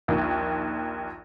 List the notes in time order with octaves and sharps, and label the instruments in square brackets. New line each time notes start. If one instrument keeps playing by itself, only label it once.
[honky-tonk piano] A#1 D#2